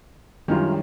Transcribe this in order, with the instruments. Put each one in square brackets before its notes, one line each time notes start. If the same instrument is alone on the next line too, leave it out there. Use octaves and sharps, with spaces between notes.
[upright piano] F#2 D#3 [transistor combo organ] G3 [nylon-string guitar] G#3 F4 [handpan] D4 E4 C#5